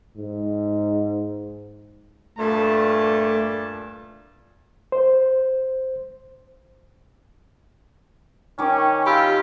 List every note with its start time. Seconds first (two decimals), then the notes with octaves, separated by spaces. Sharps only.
0.17 G#2
2.38 G2 A#2 A3 A5
4.92 C5
8.59 D#3 C#4 D6
9.06 F4 G4 B5 E6